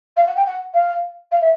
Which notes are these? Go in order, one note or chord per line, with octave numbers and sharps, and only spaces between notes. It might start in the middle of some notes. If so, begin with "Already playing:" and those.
F5
F#5
G5
F#5
F5
F5
E5